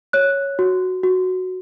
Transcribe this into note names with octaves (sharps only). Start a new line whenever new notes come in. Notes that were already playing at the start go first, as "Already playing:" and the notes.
C#5 F#6
F#4
F#4